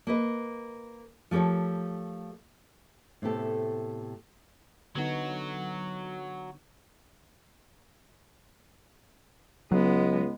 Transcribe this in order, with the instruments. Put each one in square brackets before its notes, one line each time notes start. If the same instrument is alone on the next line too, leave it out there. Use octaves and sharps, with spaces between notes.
[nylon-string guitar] A#3 B4 D#5
F3 A3 G4 A#4 C#5
A2 C3 A3 B3 G4 A4
[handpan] D3 B3 D#4 [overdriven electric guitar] F#3 F#4
[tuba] C#2 [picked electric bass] F#3 [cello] G#3 B3